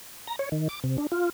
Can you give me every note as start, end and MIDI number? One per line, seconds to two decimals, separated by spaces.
0.28 0.36 82
0.39 0.49 73
0.52 0.68 51
0.69 0.80 86
0.84 0.97 48
0.98 1.07 62
1.12 1.30 65